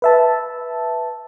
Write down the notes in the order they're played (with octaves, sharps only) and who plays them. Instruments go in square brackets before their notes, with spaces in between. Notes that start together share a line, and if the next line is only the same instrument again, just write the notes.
[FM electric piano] B4 E5 A5